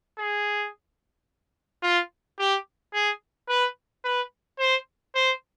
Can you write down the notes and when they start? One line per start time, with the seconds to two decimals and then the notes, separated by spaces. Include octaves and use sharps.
0.18 G#4
1.83 F4
2.39 G4
2.93 G#4
3.48 B4
4.05 B4
4.59 C5
5.15 C5